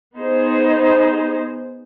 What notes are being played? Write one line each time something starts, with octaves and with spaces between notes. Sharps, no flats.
B3 D#4 G#4 C5